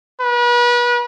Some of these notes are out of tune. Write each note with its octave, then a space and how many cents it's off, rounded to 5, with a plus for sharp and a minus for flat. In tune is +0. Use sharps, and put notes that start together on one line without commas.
B4 -35